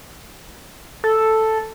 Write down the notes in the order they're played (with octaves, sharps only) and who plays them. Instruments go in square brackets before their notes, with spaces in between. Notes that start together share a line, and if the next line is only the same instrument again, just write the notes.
[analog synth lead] A4